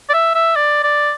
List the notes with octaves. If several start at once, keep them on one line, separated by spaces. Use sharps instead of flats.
D5
E5
E5
D5
D5